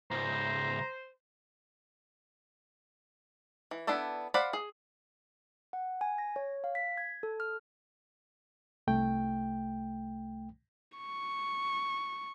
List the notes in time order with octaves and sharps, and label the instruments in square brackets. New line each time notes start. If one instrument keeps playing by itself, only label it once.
[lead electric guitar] C#2 G#2 [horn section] C5 [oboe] A#5
[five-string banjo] E3
B3 D4 E4 A4 D5
C5 D5 F5 F#5 B5
G#4
[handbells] F#5
G#5
A#6
C#5
F5
B6
G#6
A4
F6
[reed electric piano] C2 A3 G5
[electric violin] C#6